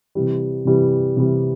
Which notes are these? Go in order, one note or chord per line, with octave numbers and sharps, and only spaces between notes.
C3 E3 G3
C3 E3 G3
C3 E3 G3